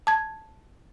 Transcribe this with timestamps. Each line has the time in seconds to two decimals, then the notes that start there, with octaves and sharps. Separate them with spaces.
0.07 A5 G#6